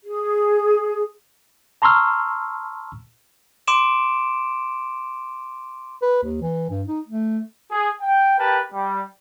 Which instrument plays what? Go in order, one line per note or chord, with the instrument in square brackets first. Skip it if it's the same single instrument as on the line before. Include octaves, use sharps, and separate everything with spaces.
[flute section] G#4
[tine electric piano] A5 A#5 C6 C#6 E6 F6
[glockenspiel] C6 D6 D7 E7
[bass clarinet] B4
D#2
E3
G2
D#4
A3
[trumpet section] G#4
G5
G4 A#4 B4 G5 A5
G3